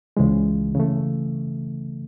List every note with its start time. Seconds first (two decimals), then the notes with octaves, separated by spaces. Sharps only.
0.17 C#2 C#3 E3 G#3
0.75 C#3 E3 A3